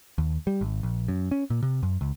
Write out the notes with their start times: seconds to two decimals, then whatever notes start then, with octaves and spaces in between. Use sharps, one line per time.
0.18 D#2
0.47 G3
0.61 G#1
0.83 A#1
1.08 F#2
1.31 C#4
1.50 A#2
1.63 C3
1.83 F#2
2.01 C#2